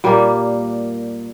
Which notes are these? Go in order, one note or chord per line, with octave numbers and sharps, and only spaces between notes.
A#2 G3 A#3